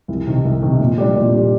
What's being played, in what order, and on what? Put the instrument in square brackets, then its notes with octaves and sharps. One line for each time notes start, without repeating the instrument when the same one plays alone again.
[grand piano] C2
C3 D#3
C2
C3 D#3
A#2
G3 D4 G4
A#2
G3 D4 G4